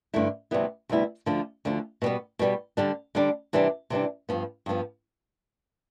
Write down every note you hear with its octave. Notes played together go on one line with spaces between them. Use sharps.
G2 D3 A3 E4
D2 C3 G3 B3 E4
D2 C3 G3 B3 E4
D2 D3 F3
D2 D3 F3
B2 G3 B3
B2 G3 B3
D3 G3 D4
D3 G3 D4
C3 E3 G3 D4
C3 E3 G3 D4
G2 F3 B3
G2 F3 B3